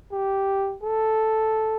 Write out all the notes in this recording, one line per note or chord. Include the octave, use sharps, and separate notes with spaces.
G4
A4